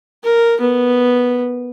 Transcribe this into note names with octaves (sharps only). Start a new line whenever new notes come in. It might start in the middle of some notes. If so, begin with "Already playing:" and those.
A#4
B3